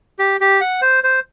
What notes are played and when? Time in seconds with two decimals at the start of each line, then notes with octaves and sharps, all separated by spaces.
0.19 G4
0.41 G4
0.61 F#5
0.82 C5
1.04 C5